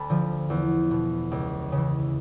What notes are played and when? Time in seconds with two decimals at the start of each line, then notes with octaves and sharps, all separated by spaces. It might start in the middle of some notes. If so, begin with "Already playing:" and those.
Already playing: D2 A5 B5
0.09 D3 F3
0.50 E2
0.90 B2
1.31 C#2
1.72 C#3
1.77 E3